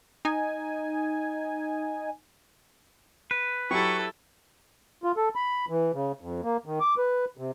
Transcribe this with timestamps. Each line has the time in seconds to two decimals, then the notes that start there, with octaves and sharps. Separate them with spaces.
0.25 D#4 G#5
3.31 B4
3.71 F#3 E4 G4 A4 C#6
5.04 F4
5.17 A4
5.35 B5
5.69 E3
5.93 C#3
6.21 F2
6.43 A#3
6.66 D#3
6.80 D6
6.98 B4
7.37 C3